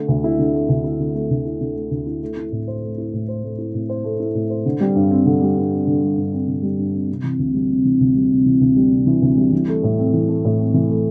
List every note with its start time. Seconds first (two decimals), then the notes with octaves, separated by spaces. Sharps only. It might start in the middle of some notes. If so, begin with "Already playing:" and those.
Already playing: D3 A3
0.08 D2
0.24 E4
0.39 D3
0.54 A3
0.69 D2
0.84 E4
1.00 D3
1.15 A3
1.30 D2
1.45 E4
1.61 D3
1.76 A3
1.91 D2
2.07 E4
2.22 A3
2.37 E4
2.52 A2
2.68 C5
2.82 A3
2.98 E4
3.13 A2
3.29 C5
3.43 A3
3.58 E4
3.74 A2
3.89 C5
4.04 A3
4.20 E4
4.35 A2
4.50 C5
4.66 D3
4.81 G3
4.96 G2
5.11 C4
5.26 D3
5.42 G3
5.57 G2
5.72 C4
5.87 D3
6.03 G3
6.17 G2
6.33 C4
6.48 D3
6.63 G3
6.79 G2
6.93 C4
7.09 C3
7.24 E3
7.39 D2
7.54 G3
7.70 C3
7.85 E3
8.01 D2
8.16 G3
8.31 C3
8.46 E3
8.61 D2
8.76 G3
8.91 C3
9.07 E3
9.22 D2
9.37 G3
9.53 E3
9.68 A3
9.83 A2
9.99 C4
10.14 E3
10.29 A3
10.45 A2
10.60 C4
10.74 E3
10.90 A3